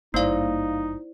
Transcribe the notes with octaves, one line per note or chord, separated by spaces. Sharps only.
G#1 G2 A#3 D#4 E4 C5 D5 F5